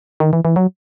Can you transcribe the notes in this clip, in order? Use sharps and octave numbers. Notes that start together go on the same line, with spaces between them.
D#3
E3
E3
F#3